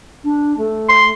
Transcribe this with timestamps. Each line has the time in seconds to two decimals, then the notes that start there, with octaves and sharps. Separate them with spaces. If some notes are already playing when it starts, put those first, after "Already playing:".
0.24 D4
0.58 A3
0.89 C6